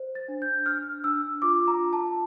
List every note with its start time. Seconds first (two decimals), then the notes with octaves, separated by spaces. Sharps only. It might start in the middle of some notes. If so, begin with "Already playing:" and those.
Already playing: C5
0.15 A6
0.28 D4
0.42 G6
0.66 D4 F6
1.04 D4 E6
1.42 F4 D6
1.68 A#5
1.79 F4
1.93 A5